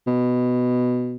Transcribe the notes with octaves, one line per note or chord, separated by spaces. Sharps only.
B2